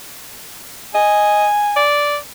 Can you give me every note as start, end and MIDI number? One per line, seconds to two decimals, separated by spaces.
0.94 1.46 75
0.94 1.83 80
1.76 2.17 74